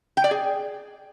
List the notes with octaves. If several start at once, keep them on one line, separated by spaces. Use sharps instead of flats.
G5
D5
G#4